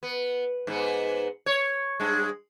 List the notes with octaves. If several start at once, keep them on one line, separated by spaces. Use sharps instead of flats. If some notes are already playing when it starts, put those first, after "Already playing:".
B3
G#2 B3
C#5
G2 G#3